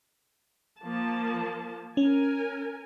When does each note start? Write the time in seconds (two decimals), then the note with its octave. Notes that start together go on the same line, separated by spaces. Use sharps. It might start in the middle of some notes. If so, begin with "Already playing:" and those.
0.79 F3 A#3 A5
1.97 C#4 A#4 G#5